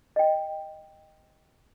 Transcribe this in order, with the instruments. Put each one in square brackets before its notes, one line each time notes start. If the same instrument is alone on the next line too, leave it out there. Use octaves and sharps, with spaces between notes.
[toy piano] D#5 G5